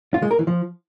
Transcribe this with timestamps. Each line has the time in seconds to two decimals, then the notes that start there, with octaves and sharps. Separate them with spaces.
0.14 F4
0.22 G#3
0.31 A#4
0.39 E3
0.47 F3